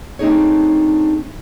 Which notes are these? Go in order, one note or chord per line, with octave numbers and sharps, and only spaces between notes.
A3 C4 D4 D#4 G#4 C#5